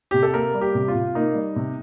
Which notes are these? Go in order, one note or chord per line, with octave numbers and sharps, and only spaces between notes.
C3 G4
A4
A#3 A#4
G3
G4
C3
F4
C3
A#3 D#4
G3
C3